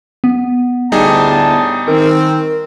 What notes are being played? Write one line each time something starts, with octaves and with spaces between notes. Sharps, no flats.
B3
D2 A2 G3 D#4 G#4 A5
D#3 C4 A#4